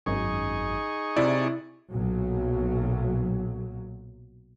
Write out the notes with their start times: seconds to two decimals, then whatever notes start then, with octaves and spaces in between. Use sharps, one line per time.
0.06 G#1 F#2 D#4 G#4 C#6
1.16 C3 E4 D5
1.91 B1 A#2 F#3